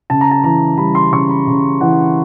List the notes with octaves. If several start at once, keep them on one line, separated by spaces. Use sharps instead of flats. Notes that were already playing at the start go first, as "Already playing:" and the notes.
C#3 A5
A#5
A5
E3 A#5
G3 B5
C6
C#3 C#6
B5
C#3
E3 F#5